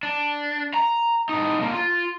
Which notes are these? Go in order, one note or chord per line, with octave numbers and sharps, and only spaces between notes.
D4
A#5
A2 D#4
D3 A#3
F4